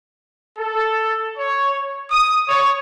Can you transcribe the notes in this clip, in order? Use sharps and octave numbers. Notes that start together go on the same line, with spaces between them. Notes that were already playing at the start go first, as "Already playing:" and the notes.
A4
C#5
D#6
C#5